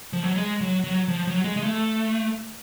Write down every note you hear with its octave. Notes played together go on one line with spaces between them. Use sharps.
F3
F#3
G#3
F#3
F#3
F3
F#3
G#3
G#3
A3